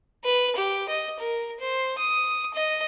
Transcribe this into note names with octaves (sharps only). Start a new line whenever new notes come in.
B4
G4
D#5
A#4
C5
D#6
D#5